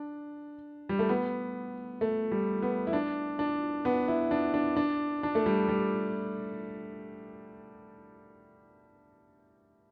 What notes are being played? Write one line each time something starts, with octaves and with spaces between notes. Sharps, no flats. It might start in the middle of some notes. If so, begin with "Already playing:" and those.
Already playing: D4
G3
A3
B3
A3
G3
B3
E4
D4
D4
B3
E4
D4
D4
D4
D4
A3
G3
G3